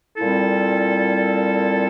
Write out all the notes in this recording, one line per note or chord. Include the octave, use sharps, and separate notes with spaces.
A#2 G3 C4 E4 A4